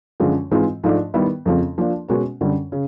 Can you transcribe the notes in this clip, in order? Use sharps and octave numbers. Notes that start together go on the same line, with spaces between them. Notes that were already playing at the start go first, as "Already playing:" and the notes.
F#2 D3 F3 G#3
G#2 E3 G#3 C4 F4
G#2 F3 A3 D4
D#3 G3 B3 E4
F2 C#3 F3 A3 C4
F3 A#3 D4
B2 G#3 C#4 F#4 A#4
F#2 D3 G3
C#3